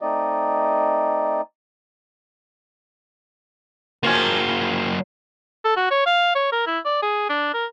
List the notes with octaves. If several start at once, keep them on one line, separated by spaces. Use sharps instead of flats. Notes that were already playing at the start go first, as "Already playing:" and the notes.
A3 C4 D#4 D5 D#5
F3 F#3 A#3 C#4
A4
F#4
C#5
F5
C#5
A#4
E4
D5
G#4
D4
A#4